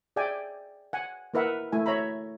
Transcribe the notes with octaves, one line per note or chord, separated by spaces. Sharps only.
G#4 D5 E5 G5 G#5
F#5 G#5
A#3 E4 A#4 B4 E5 F#5
A3 E4 G#5
C#5 E5 A#5 B5